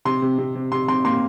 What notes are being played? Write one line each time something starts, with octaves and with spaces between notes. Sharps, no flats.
C3 C6
C3
C3
C3
C3 C6
C3 C6
A#3 C6